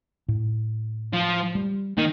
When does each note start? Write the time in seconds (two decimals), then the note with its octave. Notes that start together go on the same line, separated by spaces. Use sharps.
0.28 A2
1.13 F3
1.55 G3
1.97 D#3 A#3